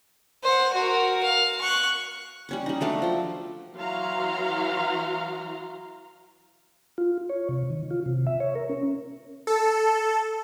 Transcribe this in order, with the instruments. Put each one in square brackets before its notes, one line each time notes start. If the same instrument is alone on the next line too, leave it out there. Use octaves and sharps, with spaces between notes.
[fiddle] C5 F#5
F#4 A#4
F5
C#6 F#6
[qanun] G3 C#4 C#6
G3 D#4
F#3 A3 D4 F5
F3 G5
[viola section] E3 F#3 F#4 F5 A#5 C6
[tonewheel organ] F4
C#5
C3
D#3
F4
C3
E5
C#5
A#4
C#4
[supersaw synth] A4